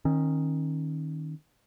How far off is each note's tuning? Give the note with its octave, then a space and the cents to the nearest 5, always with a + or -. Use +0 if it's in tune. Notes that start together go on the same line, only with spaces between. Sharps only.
D#3 +0 C#4 -35